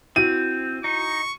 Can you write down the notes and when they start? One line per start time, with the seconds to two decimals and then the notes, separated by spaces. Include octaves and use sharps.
0.16 C4 E4 F#4 D#7
0.84 D#4 C#6